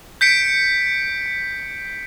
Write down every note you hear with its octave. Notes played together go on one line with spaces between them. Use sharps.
G6 B6 C#7 D7